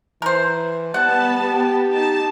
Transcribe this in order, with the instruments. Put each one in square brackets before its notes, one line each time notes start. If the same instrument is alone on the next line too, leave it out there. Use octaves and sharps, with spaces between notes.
[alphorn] E3 [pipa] A#4 C5
[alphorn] G3 [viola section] B3 A5 [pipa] F#5
[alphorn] G4
[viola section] D#4 A5